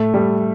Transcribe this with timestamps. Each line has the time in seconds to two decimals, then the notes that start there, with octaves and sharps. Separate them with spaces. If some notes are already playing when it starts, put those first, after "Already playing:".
Already playing: A2 A3
0.14 G3